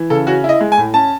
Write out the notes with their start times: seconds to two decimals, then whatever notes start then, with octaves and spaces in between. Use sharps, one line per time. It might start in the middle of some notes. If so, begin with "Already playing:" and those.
Already playing: E3
0.10 C#3 A4
0.27 C#4 F#4
0.44 E4 D#5
0.61 G#3
0.72 G#5
0.77 A2
0.94 C#4 A5